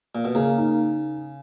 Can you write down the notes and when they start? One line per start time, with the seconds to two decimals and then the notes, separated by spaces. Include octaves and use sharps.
0.15 A#2
0.25 B2
0.35 C#3 A#3
0.58 D#4